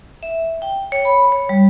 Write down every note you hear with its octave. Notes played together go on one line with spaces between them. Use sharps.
E5
G5
C#5
B5
C#5
G3